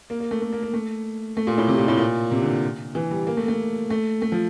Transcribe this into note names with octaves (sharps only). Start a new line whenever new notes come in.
A#3
A#3
A3
A3
A#3
A#3
A3
A3
A#2
A2
C3
A#2
A2
A#2
C3
D3
E3
G3
A#3
A3
A3
A3
A3
F3